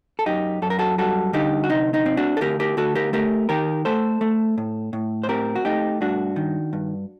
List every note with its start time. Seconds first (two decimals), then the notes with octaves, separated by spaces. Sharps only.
0.19 A4
0.26 F#2 D#4 G4
0.62 F#2 A4
0.70 A#4
0.79 F#4 A4
0.98 G3 F#4 A4
1.33 D3 D#4 G4
1.64 F#4
1.70 C3 D#4
1.94 D#4
2.06 C4
2.17 D4 F#4
2.37 A4
2.41 D2 G4 A#4
2.60 G4 A#4
2.77 D2 F#4 A4
2.95 G4 A#4
3.13 A3 G4 A#4
3.49 D#3 G4 A#4
3.85 A3 A4 C5
4.21 A3
4.58 A2
4.93 A2
5.24 C5
5.29 C4 G4 A#4
5.56 F#4
5.65 A3 D#4 G4
6.01 G2 D4 F#4
6.36 D#3
6.73 G2